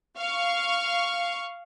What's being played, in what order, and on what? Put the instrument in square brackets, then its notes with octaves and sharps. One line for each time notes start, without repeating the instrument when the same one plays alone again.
[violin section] F5 C#6